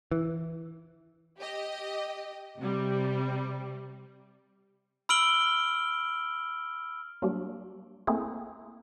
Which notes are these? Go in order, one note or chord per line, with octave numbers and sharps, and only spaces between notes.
E3
G4 D#5
C3 G3
B5 E6 F6 D7 F#7 G7
F#3 G3 A#3 D4
A3 A#3 C4 E4 G#4